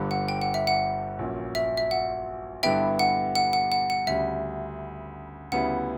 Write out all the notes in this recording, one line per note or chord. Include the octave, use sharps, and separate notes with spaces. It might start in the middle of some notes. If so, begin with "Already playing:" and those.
Already playing: G1 G2 D3 G3
F#5
G5
F#5
E5
F#5
A#1 A#2 F#3 C#4
E5
E5
F#5
G2 D3 G3 B3 E4 E5 G5
F#5
F#5
F#5
F#5
F#5
D2 C#3 G3 E5
D2 C#3 G3 B3 E4 F#5